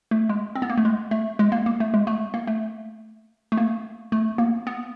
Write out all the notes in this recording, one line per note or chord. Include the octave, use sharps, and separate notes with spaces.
A3
G#3
C4
B3
A#3
A3
G#3
A3
G#3
A#3
A#3
A3
G#3
A3
A#3
A3
A3
A#3
A3
A#3
B3